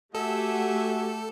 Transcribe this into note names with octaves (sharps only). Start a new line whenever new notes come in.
A3 F#4 G4 A4 E5 F#5 G#5